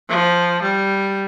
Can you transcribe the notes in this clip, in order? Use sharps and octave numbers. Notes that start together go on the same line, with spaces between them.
F3
G3